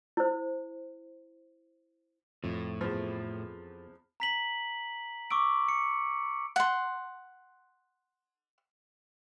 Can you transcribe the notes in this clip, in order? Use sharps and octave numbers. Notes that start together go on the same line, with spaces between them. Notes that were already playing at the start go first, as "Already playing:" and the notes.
E4 C5
F2 A2
E2 F3
A#5 B6 F#7
C#6 D6 E6 D7
C#7
F#5 C6